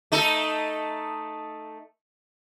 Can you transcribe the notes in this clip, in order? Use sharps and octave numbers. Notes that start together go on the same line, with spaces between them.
A3 D#4 A4